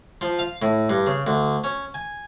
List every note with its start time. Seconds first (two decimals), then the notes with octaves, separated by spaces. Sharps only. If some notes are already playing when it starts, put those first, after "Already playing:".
0.21 F3
0.39 F5
0.62 A2
0.90 G2
1.07 C#3
1.27 D2
1.64 C#4
1.94 G#5